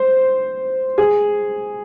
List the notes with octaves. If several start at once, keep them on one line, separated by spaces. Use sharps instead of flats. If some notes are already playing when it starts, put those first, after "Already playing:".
Already playing: C5
G#4